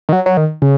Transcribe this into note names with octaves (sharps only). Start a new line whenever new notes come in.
D#3
F#3
F#3
D#3
C#3